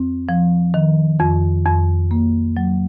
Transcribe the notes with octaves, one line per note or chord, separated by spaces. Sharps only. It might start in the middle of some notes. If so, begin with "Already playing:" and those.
Already playing: F2 C4
F3
D#3
F2
F2
A#3
F#3